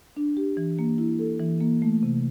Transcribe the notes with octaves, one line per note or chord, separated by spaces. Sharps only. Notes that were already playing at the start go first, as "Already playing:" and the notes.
D4
G4
E3
A#3
E4
A4
E3
A#3
A3
C3